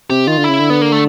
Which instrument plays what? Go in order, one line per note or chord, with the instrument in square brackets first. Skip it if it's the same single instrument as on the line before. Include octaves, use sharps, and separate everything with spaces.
[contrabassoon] C3 [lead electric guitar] G4
[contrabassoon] D#3 [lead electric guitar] F4
[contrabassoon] D3
[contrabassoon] C#3 [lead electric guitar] E4
[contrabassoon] D3
[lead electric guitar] B3
A#3
A3